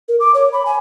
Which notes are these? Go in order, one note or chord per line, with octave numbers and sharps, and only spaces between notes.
A#4
D6
C#5
B5
G#5